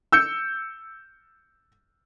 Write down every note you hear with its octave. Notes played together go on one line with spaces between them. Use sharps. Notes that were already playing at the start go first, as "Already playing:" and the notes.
E6 G6 C#7